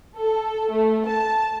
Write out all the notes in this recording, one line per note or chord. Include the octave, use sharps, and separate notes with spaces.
A4
A3
A5